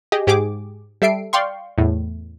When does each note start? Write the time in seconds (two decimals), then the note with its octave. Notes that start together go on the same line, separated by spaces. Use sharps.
0.12 G4 G#4 D#5
0.27 G#2 G4 G#4 D6
1.02 G3 A4 E5 C7 D7
1.33 D5 F5 G5 C6 C#6
1.78 E2 A2